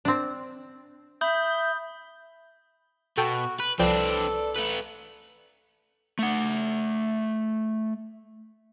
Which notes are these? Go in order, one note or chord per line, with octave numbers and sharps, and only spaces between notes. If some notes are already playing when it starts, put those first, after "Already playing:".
C4 D4
E5 B5 D#6 G6
B2 F#4 A4 G5 A5
B4 F#6
C2 F3 C4 D4 A4 B4 D5 G5
A3 B4
A3 F#5